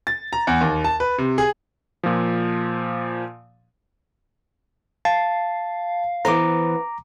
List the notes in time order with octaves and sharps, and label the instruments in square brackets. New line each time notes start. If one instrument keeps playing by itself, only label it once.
[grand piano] A6
A#5
E2
D#2
A5
B4
C3
G#4
[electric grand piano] A#2 F3
[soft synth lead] F5 [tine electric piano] A5
[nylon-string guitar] E3 B3 C5 [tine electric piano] A#5 D6